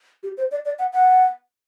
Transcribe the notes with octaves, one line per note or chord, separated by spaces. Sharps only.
G4
C5
D5
D5
F#5
F#5